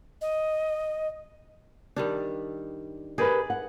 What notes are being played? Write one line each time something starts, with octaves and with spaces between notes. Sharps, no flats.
D#5
D#3 G3 D4
D#4 G4 G#4 A#4 B4 D5
F#5